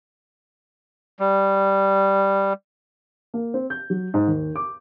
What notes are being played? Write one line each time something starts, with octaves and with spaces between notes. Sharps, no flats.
G3
A#3
C4
G6
F#3
G#2
D#2
D6